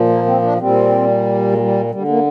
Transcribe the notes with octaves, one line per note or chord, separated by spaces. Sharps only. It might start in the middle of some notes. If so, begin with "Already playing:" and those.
Already playing: A#2 F3
A#3
C4
D4
A#2 G3 C4
G#3
G3
D3 G3
A#3